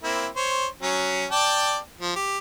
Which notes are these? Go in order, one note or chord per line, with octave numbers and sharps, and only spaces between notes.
A#3 C4 E4
C5 C#5
F#3 C#4
D5 G5 A5
F3
G4